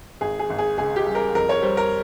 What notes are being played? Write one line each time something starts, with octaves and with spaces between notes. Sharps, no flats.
G#1 G#4
G#4
G#1
G#4
C#2 G#4
G4
G3
A#4
F2 A#4
C#5
G3 C5
A#4